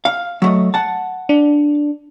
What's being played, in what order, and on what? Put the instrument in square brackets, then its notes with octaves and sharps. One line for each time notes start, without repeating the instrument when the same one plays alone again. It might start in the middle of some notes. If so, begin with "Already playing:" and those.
[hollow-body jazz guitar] F5
F#3 A3 D#5
F#5 A5
[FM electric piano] D4